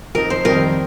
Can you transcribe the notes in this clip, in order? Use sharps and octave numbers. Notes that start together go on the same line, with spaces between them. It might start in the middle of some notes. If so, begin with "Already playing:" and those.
F2 F3 D#4 A#4
C5
F2 D#3 G3 C4 D#4 A#4